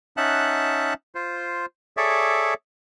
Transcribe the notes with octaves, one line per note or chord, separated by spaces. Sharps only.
C#4 D#4 E5 F#5 A5 F#6
F4 C5
G#4 A4 C#5 D5 E5